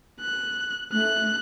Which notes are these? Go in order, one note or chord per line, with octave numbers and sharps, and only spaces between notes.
F#6
A3 F#6